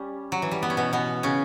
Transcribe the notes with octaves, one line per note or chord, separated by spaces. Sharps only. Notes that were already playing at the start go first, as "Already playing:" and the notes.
Already playing: G3 C#4
F#3
E3
G3
B3
C#4
B2 B3
B2 B3
C#3 C#4